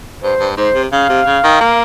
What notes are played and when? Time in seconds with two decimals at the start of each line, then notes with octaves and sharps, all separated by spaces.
0.23 G2 C5
0.40 G2
0.57 G#2 C5
0.74 C3
0.92 C#3 F5
1.09 C3
1.26 C#3
1.43 D#3
1.61 A#3